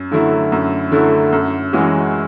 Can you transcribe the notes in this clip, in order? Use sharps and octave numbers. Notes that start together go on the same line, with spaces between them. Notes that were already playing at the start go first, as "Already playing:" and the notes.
Already playing: F#2
D3 F#3 A3 E4
F#2
D3 F#3 A3 E4
F#2
E3 G#3 C#4 F#4